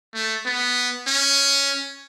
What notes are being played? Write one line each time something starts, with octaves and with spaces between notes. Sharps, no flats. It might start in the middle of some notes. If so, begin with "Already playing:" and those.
A3
B3
C#4